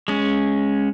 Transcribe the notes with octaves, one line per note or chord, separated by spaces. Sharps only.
G#3 C#4